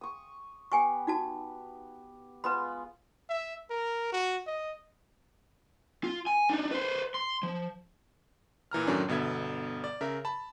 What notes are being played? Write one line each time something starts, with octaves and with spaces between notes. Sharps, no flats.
C#6 D#6
B3 G4 G5 G#5 C#6
D#4 F#4 A5
G#3 B3 F4 B4 B5
E5
A#4
F#4
D#5
F4
G#5
D4 D#4
B4 C5
C6
F3
A#2 E3 A#5 F6
F#2 A2 D#3 F#3 C#4 D4
G1 B2 D3 E5 G#6
D5
C#3 A#4 E5
A5 B5